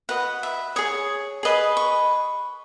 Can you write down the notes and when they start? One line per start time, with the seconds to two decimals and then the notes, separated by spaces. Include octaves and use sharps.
0.09 F#4 B4 D#5 F#5
0.43 E5
0.76 G#4 C#5 D#6
1.43 G#4 B4 D#5
1.77 C#6